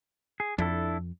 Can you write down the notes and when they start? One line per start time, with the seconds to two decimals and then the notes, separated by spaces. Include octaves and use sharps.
0.40 G#4
0.58 F2 D4 E4 A4